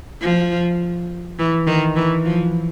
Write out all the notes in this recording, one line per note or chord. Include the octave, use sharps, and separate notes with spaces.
F3
E3
D#3
E3
F3